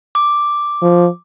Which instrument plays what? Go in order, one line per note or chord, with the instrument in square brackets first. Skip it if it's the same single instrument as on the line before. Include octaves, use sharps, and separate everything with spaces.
[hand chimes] D6
[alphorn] F3